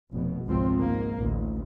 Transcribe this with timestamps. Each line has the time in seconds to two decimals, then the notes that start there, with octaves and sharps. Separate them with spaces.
0.11 F1 B2
0.45 G#1 C#2 F3 C4
0.79 G#2 A#3
1.18 A1 D2